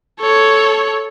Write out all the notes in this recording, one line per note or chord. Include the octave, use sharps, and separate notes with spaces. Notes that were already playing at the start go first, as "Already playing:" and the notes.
A4 C#5